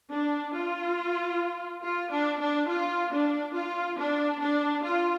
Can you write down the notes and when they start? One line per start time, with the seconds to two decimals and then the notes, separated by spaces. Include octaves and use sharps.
0.12 D4
0.55 F4
1.83 F4
2.11 D4
2.41 D4
2.68 F4
3.12 D4
3.54 F4
3.98 D4
4.40 D4
4.84 F4